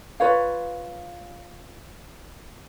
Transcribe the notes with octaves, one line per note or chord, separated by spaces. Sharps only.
F4 B4 C#5 F5